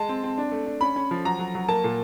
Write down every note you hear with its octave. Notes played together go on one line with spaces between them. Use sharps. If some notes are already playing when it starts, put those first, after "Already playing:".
Already playing: G#3 A5
C4
C4
D4
A3
D4
C#4 B5
C#4
F3
F#3 A#5
F#3
F#3
A#3 A5
A#2